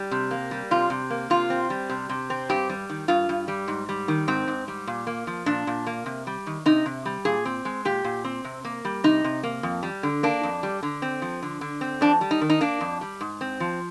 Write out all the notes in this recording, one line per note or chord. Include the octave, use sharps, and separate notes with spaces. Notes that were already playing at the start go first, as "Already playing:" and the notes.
Already playing: G3
C3
A#3
G3
C3 F4
C3
A#3
C3 F4
C4
G3
C3
C3
C4
G2 G4
G3
D#3
G2 F4
G2
G3
G#2
G3
D#3
G#2 C4
G#2
G3
A#2
A#3
F3
A#2 D4
A#2
A#3
C3
G3
D#3
C3 D#4
C3
G3
A#2 G#4
C4
G#3
A#2 G4
A#2
C4
C3
A#3
G3
C3 D#4
C3
A#3
F2
G3
D3
A#3 D4
F2
G3
D3
C4
F3
D3
D3
C4
F2 D4
G3
D#4
D#3
D#4
A#3 D4
F2
G3
G#2
C4
F3